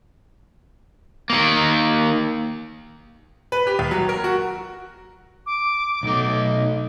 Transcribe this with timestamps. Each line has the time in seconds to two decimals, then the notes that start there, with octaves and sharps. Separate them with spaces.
1.30 D#3 A#3
3.52 B4
3.67 G4
3.79 D#2
3.91 F#3
4.09 A#4
4.24 F#4
5.46 D6
6.03 B1 A3 D#4